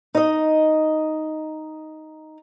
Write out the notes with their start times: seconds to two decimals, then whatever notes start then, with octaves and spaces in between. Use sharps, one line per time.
0.15 D#4 D#5